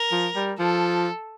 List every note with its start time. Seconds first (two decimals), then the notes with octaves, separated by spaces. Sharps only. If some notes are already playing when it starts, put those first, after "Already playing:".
Already playing: A#4
0.12 F3
0.36 G3
0.59 F3 A4